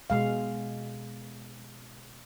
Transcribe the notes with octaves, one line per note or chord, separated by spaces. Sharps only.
B2 G#3 F5